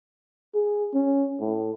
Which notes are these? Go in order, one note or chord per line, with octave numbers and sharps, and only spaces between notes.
G#4
C#4
A2